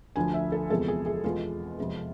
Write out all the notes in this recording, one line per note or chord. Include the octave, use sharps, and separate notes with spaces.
D2 D3 F3 G#5
E5
A4
E2 C3 F3 G#3 A4
G#4
G#4
E2 B2 G#3 F4
F2 C3 G#3